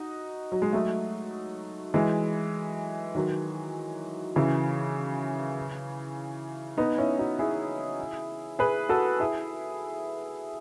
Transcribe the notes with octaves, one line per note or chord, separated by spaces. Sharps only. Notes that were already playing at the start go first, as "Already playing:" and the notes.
Already playing: D#4 F#4
F#3
G#3
F#3 A3
E3 G#3
D#3 F#3
C#3 E3
B3 D#4
C#4 E4
D#4 F#4
E4 G#4
G#4 B4
F#4 A4
E4 G#4